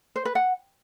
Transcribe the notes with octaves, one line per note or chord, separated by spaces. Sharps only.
C5
B4
F#5